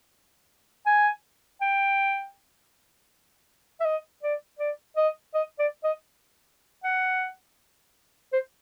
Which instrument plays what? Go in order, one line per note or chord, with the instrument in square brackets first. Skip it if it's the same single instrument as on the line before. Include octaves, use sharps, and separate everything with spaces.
[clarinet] G#5
G5
E5
D#5
D5
D5
D#5
D#5
D5
D#5
F#5
C5